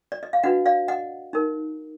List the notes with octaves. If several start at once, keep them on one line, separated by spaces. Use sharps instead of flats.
D5
D#5
F5
D4 F#4 B4 D#5 F#5
D5 F5
D#5 F#5
D#4 A#4